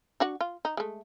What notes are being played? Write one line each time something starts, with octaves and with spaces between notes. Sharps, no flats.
D4 F#4 F#5
F4
D#4
G#3 A3